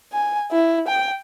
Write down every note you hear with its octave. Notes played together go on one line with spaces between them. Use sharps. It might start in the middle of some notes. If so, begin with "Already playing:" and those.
G#5
E4
G5